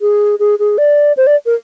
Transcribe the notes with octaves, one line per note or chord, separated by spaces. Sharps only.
G#4
G#4
G#4
D5
C5
D5
A#4